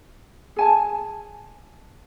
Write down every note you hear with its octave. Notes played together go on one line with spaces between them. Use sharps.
G#4 G#5 A5